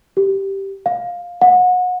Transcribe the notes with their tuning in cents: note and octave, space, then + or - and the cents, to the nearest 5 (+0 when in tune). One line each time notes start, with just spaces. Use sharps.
G4 -5
F5 +10
F#5 -30